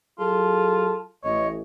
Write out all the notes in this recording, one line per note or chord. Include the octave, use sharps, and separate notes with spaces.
F#3 F4 G#4 A4 A5
A1 C#5 D#5